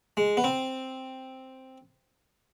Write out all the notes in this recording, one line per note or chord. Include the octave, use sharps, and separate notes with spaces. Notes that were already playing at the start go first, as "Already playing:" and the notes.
G#3
B3
C4